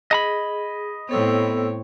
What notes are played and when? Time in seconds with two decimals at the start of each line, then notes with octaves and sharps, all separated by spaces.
0.11 G#4 D#5 A#5 B5
1.09 A2 B3 C4 A4 C#5 E6